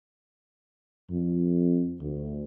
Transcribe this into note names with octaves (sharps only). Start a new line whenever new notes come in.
F2
D2